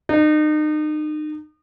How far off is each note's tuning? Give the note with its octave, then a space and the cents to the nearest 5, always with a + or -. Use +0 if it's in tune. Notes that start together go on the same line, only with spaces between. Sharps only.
D#4 -35